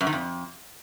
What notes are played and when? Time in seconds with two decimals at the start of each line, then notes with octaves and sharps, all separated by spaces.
0.01 F#2
0.07 D#3
0.13 F2